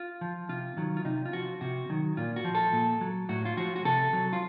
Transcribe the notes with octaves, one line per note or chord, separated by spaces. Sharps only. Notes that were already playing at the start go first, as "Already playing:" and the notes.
Already playing: F4
F3
C3 F4
D#3 F#3
F4
C3 D#4
F4
F3 F#4
C3 F#4
D#3 F#3
A#2 F4
F#4
F3
A4
A#2
F#3
A2 F#4
F4
F3 F#4
F#4
C3 A4
F#3
F4